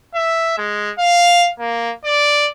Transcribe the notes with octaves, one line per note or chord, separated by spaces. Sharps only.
E5
G#3
F5
A#3
D5